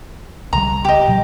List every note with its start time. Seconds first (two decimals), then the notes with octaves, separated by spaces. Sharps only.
0.53 C2 C#3 G3 A#5
0.85 G4 D#5
1.08 A#2 F#3 G3